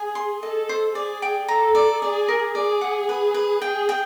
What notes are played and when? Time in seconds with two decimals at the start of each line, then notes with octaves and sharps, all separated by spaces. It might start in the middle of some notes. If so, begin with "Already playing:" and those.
Already playing: G#4 G#5
0.15 C6
0.42 A4 D#5
0.69 C5
0.95 G#4 D5
1.22 G5
1.48 A4 A#5
1.75 D5
2.02 G#4 D5
2.28 A#4
2.55 G#4 D5
2.81 F#5
3.09 B4
3.34 B4
3.62 G#4 G5
3.89 G5